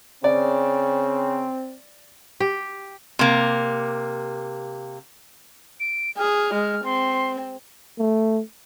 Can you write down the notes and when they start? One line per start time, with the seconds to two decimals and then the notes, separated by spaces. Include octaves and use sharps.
0.24 C#3 C4 D5
2.40 G4
3.19 C3 A#3
5.80 D7
6.18 G#4 F6
6.54 G#3
6.85 C4 C6
7.99 A3